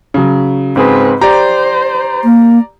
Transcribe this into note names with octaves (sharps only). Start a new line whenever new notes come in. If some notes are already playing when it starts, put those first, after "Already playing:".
C#3 F#3
G#2 C4 G#4 B4
G4 C5 D5 A#5
A#3